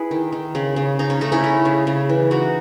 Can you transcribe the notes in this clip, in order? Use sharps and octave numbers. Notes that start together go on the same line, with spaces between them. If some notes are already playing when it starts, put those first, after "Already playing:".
Already playing: E4 G#4 B4
D#3
D#3
C#3
C#3
C#3 D#4
C#4
A3 D#4
C#4 E4
A3
C#3
C#3
E3
E3 D#4 F#4